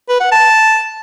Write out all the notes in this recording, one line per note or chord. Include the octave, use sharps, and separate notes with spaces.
B4
F#5
A5